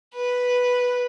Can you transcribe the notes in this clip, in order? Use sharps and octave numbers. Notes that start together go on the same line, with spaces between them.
B4